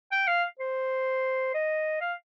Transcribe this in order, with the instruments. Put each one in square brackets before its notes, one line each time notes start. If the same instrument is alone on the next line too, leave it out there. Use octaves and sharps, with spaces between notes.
[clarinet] G5
F5
C5
D#5
F5